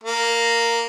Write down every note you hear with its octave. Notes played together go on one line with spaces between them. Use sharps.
A#3